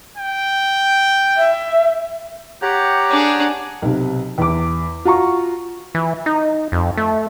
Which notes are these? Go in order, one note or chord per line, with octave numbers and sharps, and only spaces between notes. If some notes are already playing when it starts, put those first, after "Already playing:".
G5
E5
G4 C#5 F#5 A#5
D4 G#4
B1 C3
E2 D6
F4 F#4 A#5 C#6
E3
D#4
F2
A3